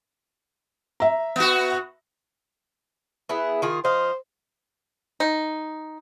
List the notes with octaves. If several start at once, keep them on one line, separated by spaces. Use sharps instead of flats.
E5 A#5
B3 F#4
B3 E4 G#4
D#3 F4 G#4
F3 C5 D#5 F5
D#4